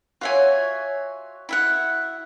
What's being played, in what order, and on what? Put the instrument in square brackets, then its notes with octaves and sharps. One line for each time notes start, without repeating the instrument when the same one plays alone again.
[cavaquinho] F4 E5 G#5 [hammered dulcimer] F#4 C#5
[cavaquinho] E4 E5 F#5